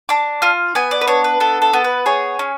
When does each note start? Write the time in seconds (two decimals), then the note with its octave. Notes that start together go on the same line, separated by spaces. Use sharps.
0.09 D4 D6
0.42 F4 F6
0.75 B3 G#5
0.91 D5
1.01 B4
1.07 D4 C#5
1.24 B4
1.40 B3 A4
1.62 A4
1.73 B3
1.84 B4
2.06 G#4 C#5
2.39 C#4